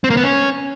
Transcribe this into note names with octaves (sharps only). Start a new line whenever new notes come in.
C4
A#3
B3
C#4